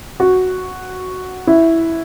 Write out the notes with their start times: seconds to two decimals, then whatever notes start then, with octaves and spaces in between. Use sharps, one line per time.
0.20 F#4
1.47 E4